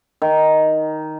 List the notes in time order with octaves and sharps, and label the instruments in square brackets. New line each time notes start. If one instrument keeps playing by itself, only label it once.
[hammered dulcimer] D#3